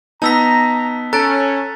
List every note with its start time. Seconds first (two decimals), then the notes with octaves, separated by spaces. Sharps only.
0.22 B3 D#4 A5 A#5 E6 B6
1.13 C#4 A4 A#5 F#6 A6 D7